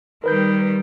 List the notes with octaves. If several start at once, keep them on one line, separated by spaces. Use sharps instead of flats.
D#3 G3 A#4 B4 G6